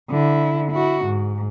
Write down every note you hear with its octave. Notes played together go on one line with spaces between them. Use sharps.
D3 E4
E4 F#4
G#2